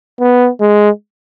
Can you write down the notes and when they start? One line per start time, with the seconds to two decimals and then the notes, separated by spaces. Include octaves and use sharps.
0.20 B3
0.61 G#3